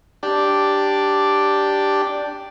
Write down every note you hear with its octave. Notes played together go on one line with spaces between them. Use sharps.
D4 G4